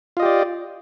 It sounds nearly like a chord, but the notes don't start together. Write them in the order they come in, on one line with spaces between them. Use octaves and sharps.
F4 D#5 G4 D5